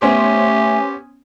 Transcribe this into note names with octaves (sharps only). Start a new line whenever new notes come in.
A3 B3 C#4 G4 C5 G#5